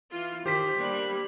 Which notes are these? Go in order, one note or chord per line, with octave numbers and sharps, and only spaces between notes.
E3 F4
D#3 G4 C5 B6
G3 A#3 D4 B5